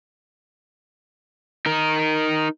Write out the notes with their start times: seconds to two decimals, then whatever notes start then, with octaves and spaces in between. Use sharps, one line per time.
1.66 D#4 A#4